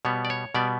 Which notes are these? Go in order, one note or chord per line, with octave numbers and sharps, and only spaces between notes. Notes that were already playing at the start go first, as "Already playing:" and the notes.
B2 G3 B3 C#5
D5
C#5
B2 G3 B3 D5